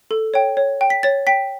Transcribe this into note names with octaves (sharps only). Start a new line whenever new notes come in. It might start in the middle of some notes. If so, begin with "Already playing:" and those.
A4
C#5 G5
C#5
G5
B6
C#5 A6
G5 B6